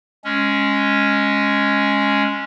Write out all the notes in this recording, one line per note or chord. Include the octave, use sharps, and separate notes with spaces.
G#3 C#4